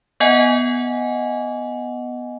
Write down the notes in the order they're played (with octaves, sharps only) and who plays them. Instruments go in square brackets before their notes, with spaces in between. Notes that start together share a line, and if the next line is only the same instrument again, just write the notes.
[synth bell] B3 D#5 F#5 G#5